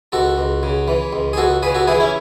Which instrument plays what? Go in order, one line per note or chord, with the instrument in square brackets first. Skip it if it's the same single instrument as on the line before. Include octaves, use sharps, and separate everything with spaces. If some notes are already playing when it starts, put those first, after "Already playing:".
[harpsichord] C#2 F#4 A4
C#2
C#3
E3
C#2
G#4
C#2 F#4 A4
C#3 G#4 B4
F#4 A4
E3 E4 G#4
C#4 E4